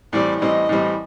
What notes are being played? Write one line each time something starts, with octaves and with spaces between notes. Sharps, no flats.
A2 E3 G3 C4 D5
A2 E3 G3 C4 D#5
A2 E3 G3 C4